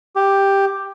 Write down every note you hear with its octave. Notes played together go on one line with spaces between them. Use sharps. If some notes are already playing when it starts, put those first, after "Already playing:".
G4